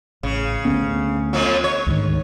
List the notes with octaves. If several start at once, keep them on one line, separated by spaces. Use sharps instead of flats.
A1 C#3
D2 B3 C#4
F2 F3 F#3
C#5
D2 G#2 D#3